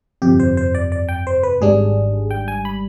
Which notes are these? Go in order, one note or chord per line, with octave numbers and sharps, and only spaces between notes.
G1 F2 C3 G4
C5
C5
D5
D5
G5
C5
B4
G#1 G#2 G3 D4 G#4
G5
G#5
B5